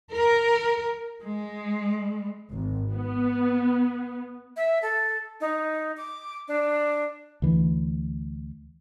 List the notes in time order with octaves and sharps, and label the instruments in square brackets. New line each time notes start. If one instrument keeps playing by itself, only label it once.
[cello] A#4
G#3
[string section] G#1
B3
[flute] E5
A4
D#4
D6
D4
[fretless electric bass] D2 E3